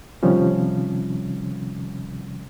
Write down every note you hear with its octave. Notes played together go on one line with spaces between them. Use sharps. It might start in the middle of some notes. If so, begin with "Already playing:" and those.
C3 D#3 F3 G3 C#4